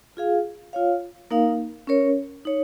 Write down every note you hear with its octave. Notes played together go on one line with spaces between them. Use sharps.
F4 G#4 F5
F4 C#5 F5
A#3 D#4 A#4 F5
C#4 A#4 C#5
D#4 C#5